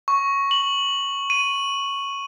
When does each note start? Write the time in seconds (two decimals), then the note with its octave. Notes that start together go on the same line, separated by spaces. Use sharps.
0.08 C#6
0.51 F#7
1.30 D#7